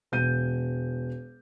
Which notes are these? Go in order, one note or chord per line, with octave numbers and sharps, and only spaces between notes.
E1 G6 D#7